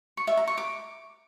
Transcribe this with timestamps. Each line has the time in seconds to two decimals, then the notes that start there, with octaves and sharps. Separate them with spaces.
0.17 C#6
0.27 E5
0.37 A#5
0.47 C#6
0.58 D6